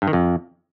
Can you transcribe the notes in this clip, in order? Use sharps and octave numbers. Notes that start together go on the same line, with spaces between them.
G2
D#3
F2